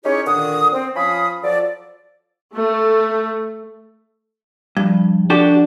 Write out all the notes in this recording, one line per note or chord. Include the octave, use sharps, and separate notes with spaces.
C#4 D#4 E4 G4 G#4 C#5
A#2 D3 D#3 D4 D#6
C4
F3 C#4 F5 B5 D#6
F3 F#3 A4 D5
A3
G2 F3
D4 F#4 G4 A4